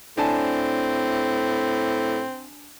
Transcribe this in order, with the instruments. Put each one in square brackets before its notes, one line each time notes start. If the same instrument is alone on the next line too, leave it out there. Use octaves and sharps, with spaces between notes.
[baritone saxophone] A2 [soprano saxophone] C4 [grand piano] D4 G#5 A5